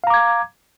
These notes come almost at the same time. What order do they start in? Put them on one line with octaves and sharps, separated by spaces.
F5 A#5 D6 G#6